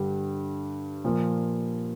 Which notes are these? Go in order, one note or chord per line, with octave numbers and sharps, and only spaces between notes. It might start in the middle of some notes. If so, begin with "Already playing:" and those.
Already playing: G2 D3 G3
A#2 F3